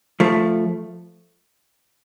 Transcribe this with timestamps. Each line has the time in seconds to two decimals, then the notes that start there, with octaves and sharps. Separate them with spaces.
0.20 F3 A3